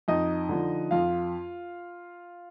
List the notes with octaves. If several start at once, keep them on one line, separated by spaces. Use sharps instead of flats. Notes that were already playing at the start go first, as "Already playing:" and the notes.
F2 D#4 D#5
D3 F3
F2 F4 F5